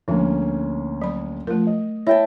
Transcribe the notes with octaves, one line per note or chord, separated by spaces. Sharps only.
D2 F3 G#3 A#3 C#4
F#3 B5
F3 A3 A#4
D#5
E4 C#5 G5 A5